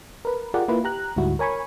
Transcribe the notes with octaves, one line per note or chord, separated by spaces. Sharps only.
A#4 B4
F4 G4 G#4 A#4 D5 F#5
A#3 E4 F4 B4
G4 A#5 F#6
D2 G#2 G3 E4 F#4
A#4 C#5 G#5 B5 C#6